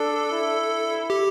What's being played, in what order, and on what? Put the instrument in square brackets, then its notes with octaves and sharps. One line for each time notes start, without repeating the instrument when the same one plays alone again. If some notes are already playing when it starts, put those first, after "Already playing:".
Already playing: [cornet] D4 [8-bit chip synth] A4
[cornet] E4
[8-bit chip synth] G4